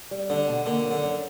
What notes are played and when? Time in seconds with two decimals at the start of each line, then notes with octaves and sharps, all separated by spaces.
0.11 G3
0.30 D3 D4
0.48 B2
0.66 D3 A#3
0.85 F#2
0.91 D3
1.03 F#2